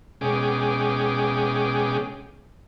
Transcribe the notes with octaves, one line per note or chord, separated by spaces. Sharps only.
B2 G#3 C#4 G#4 G5 D6